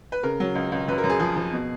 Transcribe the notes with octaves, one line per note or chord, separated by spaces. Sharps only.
B4
C#3 A#4
F#3
C#2
C#2
F#2 B4
A#4
F#2
G#4
F3 G#4
F3
B2